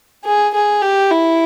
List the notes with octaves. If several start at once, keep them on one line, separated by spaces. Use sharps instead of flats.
G#4
G#4
G4
E4